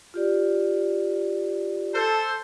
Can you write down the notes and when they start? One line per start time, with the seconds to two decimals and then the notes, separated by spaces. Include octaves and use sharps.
0.14 F4 G4 D5
1.94 A4 C5